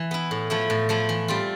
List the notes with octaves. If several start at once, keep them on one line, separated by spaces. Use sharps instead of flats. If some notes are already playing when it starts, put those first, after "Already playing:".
Already playing: E3
B3 E4
A2
F3 A3 E4
A2
F3 A3 E4
E3
G3 C4 F4